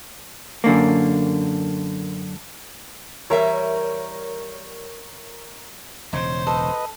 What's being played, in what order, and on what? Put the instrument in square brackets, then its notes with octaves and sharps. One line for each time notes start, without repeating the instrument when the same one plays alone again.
[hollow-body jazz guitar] F#2 D3 A#3
[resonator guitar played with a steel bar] E3 G3 E5 [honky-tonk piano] A#4 C#5
[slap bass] E1 C#3 [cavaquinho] D#4 C#5 [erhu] C5
[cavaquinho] A4 [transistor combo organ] B4 D#5